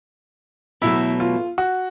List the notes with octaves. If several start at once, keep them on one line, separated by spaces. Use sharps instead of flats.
E2 B2 F#3 A3 E4
F4
F#4